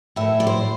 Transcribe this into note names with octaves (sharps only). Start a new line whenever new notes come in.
A2 E3 E5
D5
C5